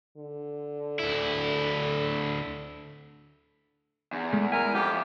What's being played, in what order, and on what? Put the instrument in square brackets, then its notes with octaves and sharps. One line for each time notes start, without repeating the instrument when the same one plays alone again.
[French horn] D3
[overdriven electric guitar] D2 E4
[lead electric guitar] E2
[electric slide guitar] G#3 A3
[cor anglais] A#4 [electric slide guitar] E5 G#5
[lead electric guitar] F2 [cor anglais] G4